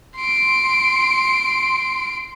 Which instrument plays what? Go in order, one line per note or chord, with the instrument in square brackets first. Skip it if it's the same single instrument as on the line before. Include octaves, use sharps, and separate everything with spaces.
[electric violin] C6 D7